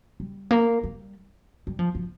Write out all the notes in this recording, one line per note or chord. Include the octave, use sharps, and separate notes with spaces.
G3
A#3
G3
G3
F3
F3